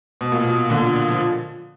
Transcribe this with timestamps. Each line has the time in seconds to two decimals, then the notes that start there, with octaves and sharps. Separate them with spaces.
0.21 B2
0.32 A#2
0.44 B2
0.70 A#2 D3
1.08 F3